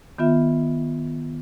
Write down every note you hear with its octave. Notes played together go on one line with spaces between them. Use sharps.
D#3 B3 F4 E5